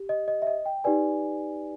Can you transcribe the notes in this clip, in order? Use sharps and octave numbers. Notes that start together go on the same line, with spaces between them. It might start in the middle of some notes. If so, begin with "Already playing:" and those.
Already playing: G4
D#5
D#5
E5
D#5
G5
D#4 G4 B4 D5 G#5